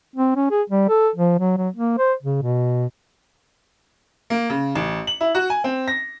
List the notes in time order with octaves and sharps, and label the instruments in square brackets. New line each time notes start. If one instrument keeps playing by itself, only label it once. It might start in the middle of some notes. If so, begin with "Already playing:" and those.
[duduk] C4
C#4
G#4
G3
A4
F3
F#3
F#3
A#3
C5
C#3
B2
[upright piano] A#3
C#3
A1
F#7
E4
F#4
G#5
C4
A#6